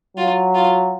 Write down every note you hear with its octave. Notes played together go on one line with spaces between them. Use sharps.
F#3 F4
F4